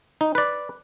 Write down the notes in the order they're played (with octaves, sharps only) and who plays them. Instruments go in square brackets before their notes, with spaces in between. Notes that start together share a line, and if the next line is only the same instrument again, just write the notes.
[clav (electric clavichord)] D#4
B4 D5